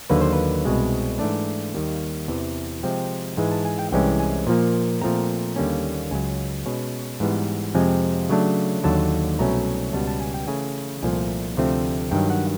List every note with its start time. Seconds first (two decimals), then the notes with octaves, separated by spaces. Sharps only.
0.10 D#2 D3 F#3 A#3 B4
0.21 C5
0.33 B4
0.65 C2 B2 G#3 C4
1.19 G#2 E3 A3 D4 D5
1.74 D#2 D#3 G3 A#3
2.28 E2 C3 E3
2.83 C3 F3 G#3 C4 G5
3.37 G#2 E3 G#3 G#5
3.51 A5
3.65 G#5
3.79 G5
3.92 C2 C3 E3 G#3 C#4 G5
4.20 G#5
4.47 A#2 F3 A#3
5.01 A#2 F3 A3 C4 A#5
5.56 D#2 D3 G3 A#3 C#4
6.11 C#2 C#3 F#3 G#5
6.66 B2 G#3 C#4
7.20 G#2 E3 G3 B3
7.75 F2 C3 F3 G#3 C4 G#5
8.30 C#3 F#3 A3 D4
8.84 D#2 D3 F#3 A5
9.39 C2 B2 F#3 A3 C#4 A#5
9.93 C#2 B2 G3 B3 A5
10.07 A5
10.21 G#5
10.34 G5
10.48 C#3 E3 A3 G#5
11.03 C2 A#2 F3 A3 G#5
11.57 D2 C3 F3 A3 C4
12.11 G2 D#3 F#3 G5
12.30 F#5